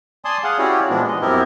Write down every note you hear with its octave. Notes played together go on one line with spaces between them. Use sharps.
D5 G#5 A5 C6 D#6
G#4 F5 F#5
C#4 E4 F#4 G4 C#5 D5
A#2 E3 F3 G#3 B3 D4
D#5
F#2 B3 C4 E4 G4 A#4